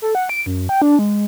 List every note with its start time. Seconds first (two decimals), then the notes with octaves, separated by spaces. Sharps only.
0.02 A4
0.15 F#5
0.29 D7
0.46 F#2
0.69 G5
0.82 D4
0.99 G#3